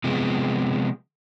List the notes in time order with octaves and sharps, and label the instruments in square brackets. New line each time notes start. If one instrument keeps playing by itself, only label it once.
[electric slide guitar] C3 F3 G#3 B3